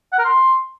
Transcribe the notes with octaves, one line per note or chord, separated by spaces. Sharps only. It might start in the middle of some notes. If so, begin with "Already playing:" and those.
F#5
A#4
C6